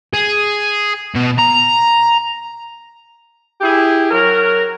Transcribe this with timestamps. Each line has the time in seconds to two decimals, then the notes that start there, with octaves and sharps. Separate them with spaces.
0.14 G#4
1.15 B2
1.39 A#5
3.61 E4 G4 G#4
4.11 F#3 A#4